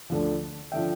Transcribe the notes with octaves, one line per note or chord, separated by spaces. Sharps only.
D2 D3 F3
D3 F3 E5 G5